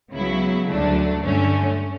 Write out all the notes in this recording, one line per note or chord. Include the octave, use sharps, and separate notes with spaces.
C#2 C#3 F#3 B3 E4
D2 D3 F#3 A3 D4
G2 D3 A3 C#4